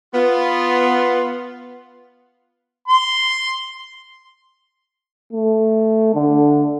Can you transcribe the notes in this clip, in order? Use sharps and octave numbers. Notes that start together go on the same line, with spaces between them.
B3 F4
C6
A3
D3